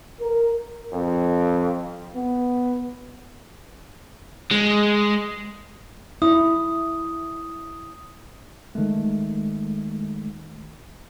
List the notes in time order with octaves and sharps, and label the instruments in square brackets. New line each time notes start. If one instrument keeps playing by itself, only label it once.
[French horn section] A#4
[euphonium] F2
B3
[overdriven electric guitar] G#3
[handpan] E4 [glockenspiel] D#6
[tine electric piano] D#3 G#3 A3